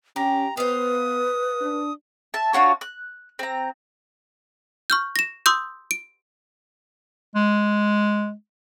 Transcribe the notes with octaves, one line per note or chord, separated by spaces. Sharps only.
C#4 G4 A#5
B3 B4 C5 F5 D#6
D4
E5 A5
D4 F4 F#4 C#5
F#6
C4 A#5
C#6 F6 G6
A#6 E7
C6 D#6 E6 G6
D7
G#3